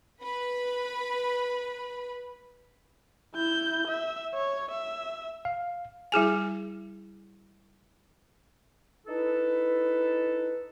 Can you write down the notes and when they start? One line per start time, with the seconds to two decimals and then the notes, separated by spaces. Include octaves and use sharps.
0.22 B4 B5
3.35 E4 G6
3.87 E5
4.34 C#5
4.71 E5
5.45 F5
6.12 G3 E4 G#4 G#5
9.07 D#4 E4 A4 B4